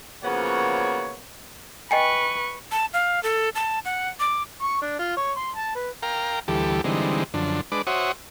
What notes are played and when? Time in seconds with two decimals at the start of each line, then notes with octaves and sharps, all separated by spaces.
0.24 C#3 F3 A#3 B3 F#4 C#5
1.91 B4 D#5 G5 G#5 C#6
2.72 A5
2.93 F5
3.23 A4
3.55 A5
3.85 F#5
4.20 D6
4.62 C#6
4.82 D4
4.99 F4
5.17 C#5
5.36 C6
5.56 A5
5.76 B4
6.03 A#4 F5 G5 A#5
6.48 D2 E3 G3 G4 A4
6.84 D3 E3 G3 G#3 C4 D#4
7.34 F#2 D3 F3 D4
7.72 G#3 D4 B4 D6
7.87 F#4 C5 C#5 E5 F#5 D#6